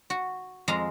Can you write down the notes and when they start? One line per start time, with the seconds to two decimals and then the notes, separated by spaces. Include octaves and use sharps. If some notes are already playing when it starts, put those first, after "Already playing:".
0.10 F#4
0.68 F2 G#3 F5 A#5